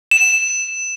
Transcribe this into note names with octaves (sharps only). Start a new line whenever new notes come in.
E7